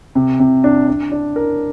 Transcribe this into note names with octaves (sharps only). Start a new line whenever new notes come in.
C3
C3
D4
D4
D4
A#4